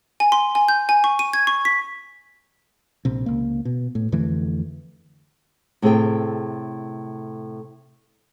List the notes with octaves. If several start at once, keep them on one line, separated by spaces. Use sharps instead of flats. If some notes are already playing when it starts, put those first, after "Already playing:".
G#5
C6
G#5
G6
G#5
C#6
D#7
G#6
C#6
B6
A#1 C3
C#2 A#3
B2
A2
F2 D3 E3 A3
A2 C3 G#4 A4 G5